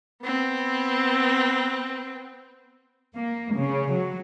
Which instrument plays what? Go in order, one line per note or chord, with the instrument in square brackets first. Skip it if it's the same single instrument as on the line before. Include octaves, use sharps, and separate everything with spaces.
[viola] B3 C4
[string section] A#3
C#3
F#3